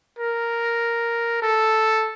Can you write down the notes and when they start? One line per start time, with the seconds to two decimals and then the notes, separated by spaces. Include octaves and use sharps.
0.19 A#4
1.42 A4